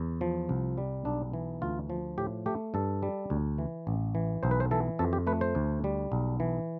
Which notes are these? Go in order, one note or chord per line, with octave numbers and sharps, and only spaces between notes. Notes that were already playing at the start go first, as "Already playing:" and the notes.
Already playing: E2
F3
C2
G3
B1 D4
E3
D2 F4
F3
A2 G4
A3 G4
G2 A4
G3
D2
E3
A1
E3
B1 C5
B4
C5
E3 A4
F2 A4
G4
A3 B4
C5
D2
G3
B1
E3